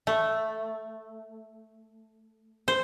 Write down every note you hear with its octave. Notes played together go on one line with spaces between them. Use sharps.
A3
C5